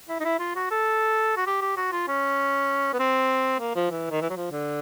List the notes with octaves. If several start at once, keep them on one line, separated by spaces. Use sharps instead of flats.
E4
D#4
E4
F4
F#4
A4
F#4
G4
G4
F#4
F4
C#4
B3
C4
A#3
F3
E3
D#3
E3
F#3
F3
D3